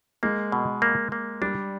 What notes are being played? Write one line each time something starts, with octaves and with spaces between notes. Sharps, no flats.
G#3 A#3
B2
A#3
A#3
G3 D4